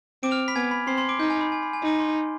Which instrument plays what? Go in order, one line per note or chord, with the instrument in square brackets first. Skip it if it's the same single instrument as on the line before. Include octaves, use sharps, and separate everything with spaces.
[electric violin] C4 [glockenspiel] D6 D7
[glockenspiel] F6 F7
B5 B6
[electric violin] B3 [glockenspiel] G#5 G#6
[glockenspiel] B5 B6
[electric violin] C4 [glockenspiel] C6 C7
[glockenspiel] C6 C7
D6 D7
[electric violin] D#4 [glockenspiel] G6
[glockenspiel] G#5
B5
G#5
B5
G#5
[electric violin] D#4 [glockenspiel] B5
[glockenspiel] C6